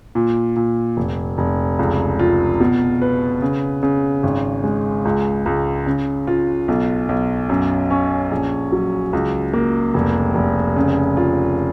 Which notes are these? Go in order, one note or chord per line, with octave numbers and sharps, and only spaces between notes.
A#2
A#2
F1
F1
C#2
F4
B2
B4
C#3
C#3
G#1
G#3
C#2
C#2
C#3
F4
B1
B1
F#2
C#4
A#1
F#3
C#2
A#3
F1
F1
C#3
F4